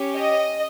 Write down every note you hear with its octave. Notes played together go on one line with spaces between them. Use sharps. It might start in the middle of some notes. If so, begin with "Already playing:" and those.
Already playing: C#4 G4
D#5